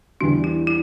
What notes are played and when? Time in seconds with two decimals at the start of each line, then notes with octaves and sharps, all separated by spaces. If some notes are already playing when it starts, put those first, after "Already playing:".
0.21 E2 E3 G3 D4
0.44 E4
0.67 E4